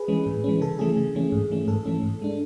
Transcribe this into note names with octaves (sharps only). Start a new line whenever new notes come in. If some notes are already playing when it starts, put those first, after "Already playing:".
Already playing: G#4 B4
E3 G#3 C#4
A2
E3 G#3 C#4
C#3 A4
E3 A3 C#4 G#4
C#3
E3 A3 C#4
G#2
E3 A3 C#4
G#2 A4
E3 A3 C#4
G#2
G#3 D4